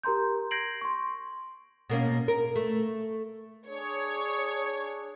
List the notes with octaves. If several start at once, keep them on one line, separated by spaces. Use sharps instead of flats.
G4 A#4 A#5 C6 G6
G6 G#6 A#6 C7 D7 F#7
C6 C#6
B2 A#3 C#4
A#4
A3
D4 G#4 C#5